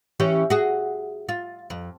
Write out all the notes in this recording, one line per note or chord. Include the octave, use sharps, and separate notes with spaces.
E3 C#4 G4
F#4 G#4
F4
F2